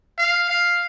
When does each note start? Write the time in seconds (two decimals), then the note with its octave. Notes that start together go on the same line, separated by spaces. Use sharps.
0.18 F5
0.49 F5